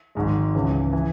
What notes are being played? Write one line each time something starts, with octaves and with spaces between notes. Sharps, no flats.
G#1 G#2 G#3
C#2 C#3 E3
E3